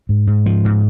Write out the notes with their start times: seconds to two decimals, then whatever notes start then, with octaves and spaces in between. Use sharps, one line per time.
0.09 G#2
0.27 G#2
0.46 F3
0.65 G#2